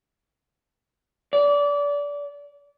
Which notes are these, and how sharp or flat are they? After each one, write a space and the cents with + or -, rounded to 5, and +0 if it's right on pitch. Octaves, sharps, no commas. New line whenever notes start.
D5 -25